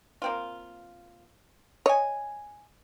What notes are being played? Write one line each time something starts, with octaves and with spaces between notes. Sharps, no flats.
A#3 C4 F4
C#5 D#5 G#5